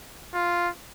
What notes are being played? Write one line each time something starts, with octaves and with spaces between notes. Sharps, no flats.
F4